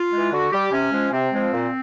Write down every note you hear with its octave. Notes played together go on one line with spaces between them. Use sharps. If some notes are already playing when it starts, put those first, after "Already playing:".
Already playing: F4
E3 G#3
D3 F#4
G3 G4
C3 C#4
F3 G#3
C3 C4
F3 G#3
A#2